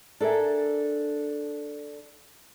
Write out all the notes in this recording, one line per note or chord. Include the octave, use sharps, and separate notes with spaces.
D4 A4 A#4 E5 G#5